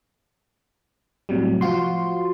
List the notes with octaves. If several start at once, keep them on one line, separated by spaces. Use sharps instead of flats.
A2 C3 F#3 G3
F3 F4 F#4 C6